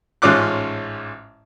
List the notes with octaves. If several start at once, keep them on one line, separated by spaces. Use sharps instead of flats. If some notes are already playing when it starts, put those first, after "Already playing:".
A1 G#2 C#4 F4 D6 F#6